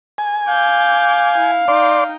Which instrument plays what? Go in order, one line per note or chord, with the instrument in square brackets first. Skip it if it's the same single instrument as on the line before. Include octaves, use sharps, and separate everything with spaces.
[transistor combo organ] G#5
[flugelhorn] F5 [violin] D6 G6
[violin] E4
[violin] D#4 G5 [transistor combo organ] D5 C6 D6